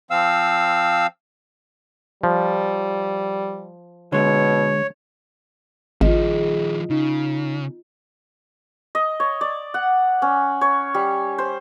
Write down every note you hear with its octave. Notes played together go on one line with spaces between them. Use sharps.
F3 C4 F5 E6
F3 G3
B2 D3 G#3 C#5
G#1 D#3 F3 F4 G#4 D#5
C#3 D#4
D#5
C#5
D5
F#5
C#4
C#5
G3
C5